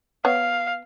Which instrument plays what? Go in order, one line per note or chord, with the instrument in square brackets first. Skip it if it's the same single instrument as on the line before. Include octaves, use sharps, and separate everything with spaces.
[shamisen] B3 C#5 [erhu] F5